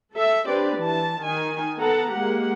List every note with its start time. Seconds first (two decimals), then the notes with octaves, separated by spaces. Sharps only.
0.13 A4 E5
0.46 C4 D4 G4 B4 D5
0.78 E3 A5
1.23 D#3 D#4 G#5
1.79 B3 A4 F#5 A5 A#5
2.11 G#3 A#3 G4 F#5